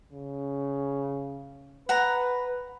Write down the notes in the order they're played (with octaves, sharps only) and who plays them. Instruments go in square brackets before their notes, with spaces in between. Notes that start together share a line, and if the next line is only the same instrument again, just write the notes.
[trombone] C#3
[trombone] B4 [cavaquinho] F#5 A#5